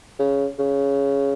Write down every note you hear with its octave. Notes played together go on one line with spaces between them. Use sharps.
C#3
C#3